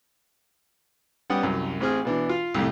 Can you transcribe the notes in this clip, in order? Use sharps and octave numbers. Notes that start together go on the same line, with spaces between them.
G3 B3 C#4 F#5 G5 D#6
C2 F#2
A1 C4 G#4 F6
B2 E3 D4
F4 F5
C2 F2 A2